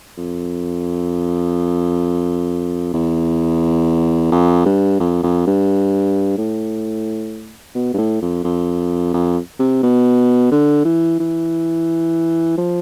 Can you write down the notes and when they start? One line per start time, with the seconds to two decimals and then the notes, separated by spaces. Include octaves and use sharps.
0.18 F2
2.94 E2
4.32 F2
4.66 G2
5.00 F2
5.23 F2
5.47 G2
6.38 A2
7.75 B2
7.94 G2
7.98 A2
8.22 F2
8.44 F2
9.14 F2
9.59 C3
9.83 B2
10.52 D3
10.85 E3
11.20 E3
12.58 F3